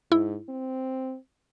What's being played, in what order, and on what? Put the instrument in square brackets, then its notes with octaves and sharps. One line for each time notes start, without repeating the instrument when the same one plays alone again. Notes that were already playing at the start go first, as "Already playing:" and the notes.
[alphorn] G#2 [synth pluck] E4
[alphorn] C4